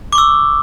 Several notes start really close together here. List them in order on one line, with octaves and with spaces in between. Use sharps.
D6 C#6 E6